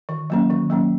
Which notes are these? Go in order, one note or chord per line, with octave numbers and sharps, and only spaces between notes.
D#3
F#3 A#3 C#4
D#3
F#3 A#3 C#4